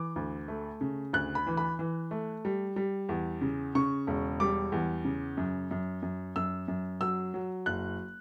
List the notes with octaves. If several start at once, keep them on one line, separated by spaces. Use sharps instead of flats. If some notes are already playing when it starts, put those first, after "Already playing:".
Already playing: E3 D6
D2
A3
C#3
D2 F#6
B5
E3
B5
E3
A3
G3
G3
E2
C#3
C#3 C#6
E1
G3 D6
E2
C#3
F#2
F#2
F#2
F#2 E6
F#2
F#3 E6
F#3
F#1 F#6